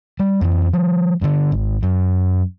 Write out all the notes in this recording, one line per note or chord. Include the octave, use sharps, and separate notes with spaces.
G3
F2 E3
F3 G3
G2 D3
G#1
F#2